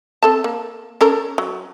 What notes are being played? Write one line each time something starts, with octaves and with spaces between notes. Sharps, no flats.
C4 A4 A5
A#3
C#4 A4 A#4
F#3